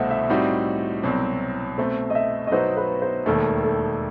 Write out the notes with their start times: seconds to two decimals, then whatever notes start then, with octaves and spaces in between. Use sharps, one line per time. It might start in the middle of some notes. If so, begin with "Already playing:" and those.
Already playing: C2 B2 A3 C5 D#5 E5 F#5
0.11 E5
0.29 A2 G3 C4 D#4 F#4
1.03 C2 B2 F#3 C4
1.78 B2 A3 C4 C5
2.10 D#5
2.15 E5
2.47 D#5
2.51 B2 F#3 B3 D#4 F#4 C5
2.77 B4
3.02 C5
3.26 E1 D#2 D#3 A3 A4
3.63 A4